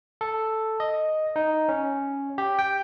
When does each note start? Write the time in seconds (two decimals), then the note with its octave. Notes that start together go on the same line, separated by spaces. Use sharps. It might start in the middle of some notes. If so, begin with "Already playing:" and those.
0.21 A4
0.80 D#5
1.36 D#4
1.69 C#4
2.38 G4
2.59 G5